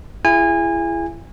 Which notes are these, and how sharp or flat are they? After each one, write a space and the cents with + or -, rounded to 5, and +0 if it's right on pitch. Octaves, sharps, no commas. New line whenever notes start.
E4 +30 G#4 +0 G#5 -25